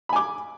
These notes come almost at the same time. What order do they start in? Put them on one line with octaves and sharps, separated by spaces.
B5 G#5 D6